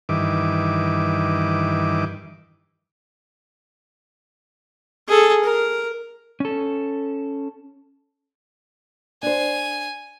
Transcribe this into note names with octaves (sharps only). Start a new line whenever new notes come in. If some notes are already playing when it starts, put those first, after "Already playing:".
G2 D#3 E3 D6
G#4 A4
A#4
C#4 A4
D4 C5 G#5